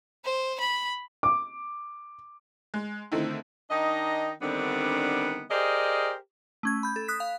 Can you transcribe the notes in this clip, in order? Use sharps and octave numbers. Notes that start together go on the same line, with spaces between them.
C5
B5
D6
G#3
D3 D#3 A3 C4 D#4 E4
D#3 D4 D#4 D#5
D3 D#3 G3 B3 C4 D4
G4 G#4 A#4 C5 D5 D#5
A3 C#4 G#6
B5 G6
A4
D#6 F#6 B6
F5